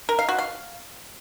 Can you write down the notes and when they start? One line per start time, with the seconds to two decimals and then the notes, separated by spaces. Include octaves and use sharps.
0.09 A#4
0.19 F5
0.29 F#4
0.38 F5